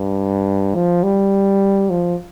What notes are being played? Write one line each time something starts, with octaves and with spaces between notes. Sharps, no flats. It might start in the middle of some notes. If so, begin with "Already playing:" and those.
Already playing: G2
F3
G3
F3